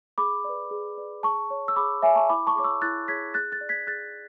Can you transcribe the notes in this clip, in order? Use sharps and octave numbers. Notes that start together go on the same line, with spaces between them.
G#4 B5 D6
B4 D5
G#4
B4 D5
G#4 A5 C#6
C#5
E6
G#4 B5 D6
C#5 E5 G#5
A5 C#6
E4 B5 D6
A5 C#6
G#4 C#5 D6
C#6 E6
E4 F#6 A6
G#4 C#5 G#6 B6
G#4 F#6 A6
F#6 A6
D5
G#6 B6
G#4 F#6 A6